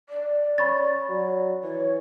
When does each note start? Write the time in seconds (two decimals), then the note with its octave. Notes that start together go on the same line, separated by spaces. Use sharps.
0.09 D5
0.58 C#4 B5 C#6 A6
1.09 F#3
1.64 E3 C#5